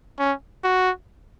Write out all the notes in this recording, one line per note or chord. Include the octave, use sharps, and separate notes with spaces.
C#4
F#4